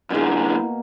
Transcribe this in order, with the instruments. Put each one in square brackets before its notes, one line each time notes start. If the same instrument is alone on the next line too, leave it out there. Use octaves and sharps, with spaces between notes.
[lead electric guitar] F#2 D3 [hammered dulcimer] B2 A#3 [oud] B3 D#4 G#4 [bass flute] E4